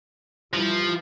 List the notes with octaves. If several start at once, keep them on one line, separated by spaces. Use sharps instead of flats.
E3 F3 G3